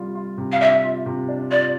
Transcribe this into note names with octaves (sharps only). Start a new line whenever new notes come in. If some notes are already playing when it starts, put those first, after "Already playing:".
Already playing: C3 G3 F4
F4
C3
F5
D4 E5
F4
C3
D4
F4 D5